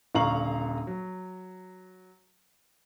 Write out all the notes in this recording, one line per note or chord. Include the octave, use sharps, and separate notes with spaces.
D#1 D3 F5 A#5 C#6 F#7
F#3